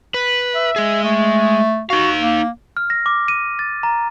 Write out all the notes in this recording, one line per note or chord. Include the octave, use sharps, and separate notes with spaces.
B4
E5
G#3 G#4
A3
D#4 F#4 F5
A#3
F6
A#6
D6
D#7
A6
A#5